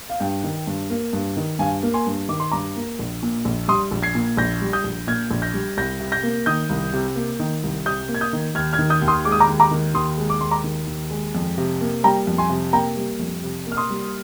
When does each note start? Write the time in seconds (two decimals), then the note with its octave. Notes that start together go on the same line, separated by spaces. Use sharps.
0.10 F5
0.20 G2 G5
0.44 D#3
0.67 G2
0.90 A#3
1.13 G2
1.37 D#3
1.59 G2 F5 G#5
1.83 A#3
1.94 G#5 C6
2.07 G2
2.29 D#3 D6
2.40 C6
2.52 G2 A#5 D6
2.76 A#3
2.99 A#1
3.23 A#2
3.45 A#1
3.68 G3 C6 D#6
3.91 A#1
4.03 G#6 C7
4.15 A#2
4.37 A#1 G6 A#6
4.61 G3
4.73 D#6 G6
4.84 A#1
5.07 A#2 F6 G#6
5.31 A#1
5.42 G6 A#6
5.54 G3
5.77 C2 G6 A#6
6.00 C3
6.12 G6 A#6
6.23 A#3
6.46 D#3 D#6 G6
6.69 C2
6.93 C3
7.16 A#3
7.40 D#3
7.63 C2
7.86 C3 D#6 G6
8.09 A#3
8.15 G#6
8.21 D#6 G6
8.33 D#3
8.55 D#2 F6 G#6
8.73 F6 G#6
8.79 D#3
8.90 D#6 G6
9.02 D#2
9.08 C6 D#6
9.25 G#3 D6
9.32 D#6
9.40 A#5 D6
9.49 D#2
9.60 A#5 D6
9.71 D#3
9.94 D#2 C6 D#6
10.18 G#3
10.30 D6
10.41 D#2 C6
10.51 A#5 D6
10.64 D#3
10.87 D#2
11.11 G#3
11.35 F2
11.58 C3
11.81 A#3
12.04 G3 G5 A#5
12.27 F2
12.38 G#5 C6
12.50 C3
12.73 A#3 G5 A#5
12.97 G3
13.19 F2
13.43 C3
13.67 A#3
13.72 F6
13.77 C6 D#6
13.90 G3